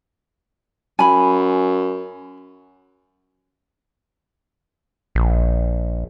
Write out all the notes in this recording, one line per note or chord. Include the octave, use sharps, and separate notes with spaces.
F#2 G#5 B5
A#1